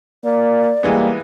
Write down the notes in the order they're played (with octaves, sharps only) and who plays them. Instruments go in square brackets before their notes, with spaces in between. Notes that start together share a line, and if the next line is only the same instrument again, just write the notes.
[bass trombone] A#3 [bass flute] D5
[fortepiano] E3 G#3 B3 [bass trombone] G3 [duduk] A#3